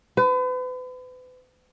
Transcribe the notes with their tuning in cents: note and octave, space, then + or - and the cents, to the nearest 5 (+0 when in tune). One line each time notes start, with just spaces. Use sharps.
B4 +40